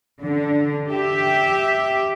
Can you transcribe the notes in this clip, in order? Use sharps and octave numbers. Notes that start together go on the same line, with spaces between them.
D3
G4 E5